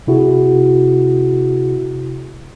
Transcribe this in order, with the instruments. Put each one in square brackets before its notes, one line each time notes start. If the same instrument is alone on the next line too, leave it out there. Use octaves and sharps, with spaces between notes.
[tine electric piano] C3 E4 F#4 G#4